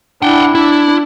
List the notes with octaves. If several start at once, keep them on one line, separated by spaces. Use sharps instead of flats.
D4 E4 F#5 G5
D4 E4